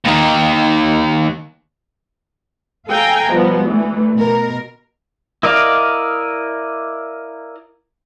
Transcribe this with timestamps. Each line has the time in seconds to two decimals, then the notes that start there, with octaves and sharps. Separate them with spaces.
0.05 D#2 D#3
2.88 A4 F5 G5 G#5 A#5
3.31 B2 F3 G3 B3
3.66 D2 E3 A3
4.15 B2 A#4
5.43 E4 A#4 D5 D#5 F5